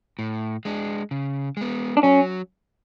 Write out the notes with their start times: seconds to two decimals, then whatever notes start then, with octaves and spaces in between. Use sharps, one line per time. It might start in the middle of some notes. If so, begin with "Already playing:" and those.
0.19 A2
0.65 G#3 D4
1.11 C#3
1.57 G#3 B3
1.97 D4
2.03 F#3 C#4